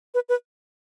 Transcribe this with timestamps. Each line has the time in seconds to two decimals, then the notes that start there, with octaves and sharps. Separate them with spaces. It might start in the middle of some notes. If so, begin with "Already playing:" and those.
0.14 B4
0.29 B4